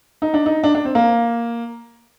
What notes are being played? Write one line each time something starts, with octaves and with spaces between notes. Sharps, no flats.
D#4
D4
D#4
D4
D4
C4
A#3